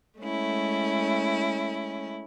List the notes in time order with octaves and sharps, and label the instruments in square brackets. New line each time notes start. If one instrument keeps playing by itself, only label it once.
[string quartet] G#3 A3 C#4 E4